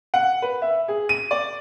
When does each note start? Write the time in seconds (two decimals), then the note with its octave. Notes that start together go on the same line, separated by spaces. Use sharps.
0.14 F#5
0.42 B4
0.62 E5
0.88 G#4
1.09 D#7
1.31 D5